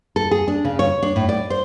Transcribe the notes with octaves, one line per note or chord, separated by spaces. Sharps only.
A4
G#4
D4
C#3
C#5
D4
A2
D5
C5